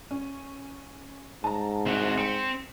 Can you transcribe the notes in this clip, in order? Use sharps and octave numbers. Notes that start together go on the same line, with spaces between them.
C#4
G#2 A5 A#5
C2 C4 F#4
C4 B6 C#7